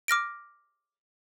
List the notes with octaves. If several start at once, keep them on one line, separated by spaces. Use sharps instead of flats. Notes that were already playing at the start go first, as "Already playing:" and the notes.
D6 F6 A#6 D7